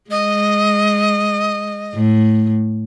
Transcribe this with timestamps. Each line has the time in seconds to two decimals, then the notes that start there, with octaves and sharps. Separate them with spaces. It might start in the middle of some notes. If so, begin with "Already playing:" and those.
0.11 G#3 D#5
1.94 A2